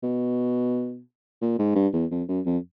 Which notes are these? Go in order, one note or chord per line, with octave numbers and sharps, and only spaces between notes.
B2
A#2
G#2
G2
E2
F2
F#2
F2